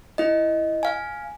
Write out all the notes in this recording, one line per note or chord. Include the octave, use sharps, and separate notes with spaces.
E4 D#5
F5 G#5